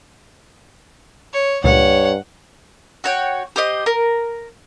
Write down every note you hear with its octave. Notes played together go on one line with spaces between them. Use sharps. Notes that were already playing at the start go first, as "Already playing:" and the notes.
C#5
C#2 G2 A#2 C#5 F#5
F#4 C#5 G5
G4 C5 D#5
A#4